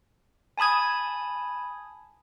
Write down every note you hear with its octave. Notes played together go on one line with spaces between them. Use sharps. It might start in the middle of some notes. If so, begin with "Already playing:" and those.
G#5 A5 B5 D#6 G#6